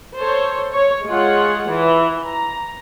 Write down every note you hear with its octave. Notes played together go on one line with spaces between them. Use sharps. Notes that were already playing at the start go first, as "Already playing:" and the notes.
A4 C5 C#5
C#5
G#3 F4 G#4 C#5 F#5
E3
A#5